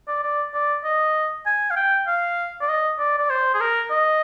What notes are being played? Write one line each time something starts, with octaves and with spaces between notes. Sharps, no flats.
D5
D5
D5
D#5
G#5
F5
G5
F5
D5
D#5
D5
D5
C5
G#4
A#4
D#5